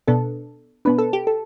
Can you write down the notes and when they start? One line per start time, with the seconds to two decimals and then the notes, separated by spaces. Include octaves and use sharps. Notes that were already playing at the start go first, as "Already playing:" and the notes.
0.08 B2 B3 D4 A4
0.85 B2 B3 D4 B4
0.98 A4
1.13 G4
1.27 A4